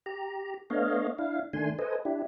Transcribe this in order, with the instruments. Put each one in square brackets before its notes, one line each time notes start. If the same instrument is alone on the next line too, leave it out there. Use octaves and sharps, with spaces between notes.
[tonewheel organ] G4 A#5
A3 B3 D4 C#5 D#5 F5
D4 E4 F5
D#3 A3 D4 G#5 C6
A4 B4 C5 D#5 G#5
D4 E4 G4